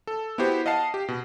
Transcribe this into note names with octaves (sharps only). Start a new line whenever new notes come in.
A4
B3 E4 F#4 G4 C5
D#5 F5 F#5 A5 C7
G4
B2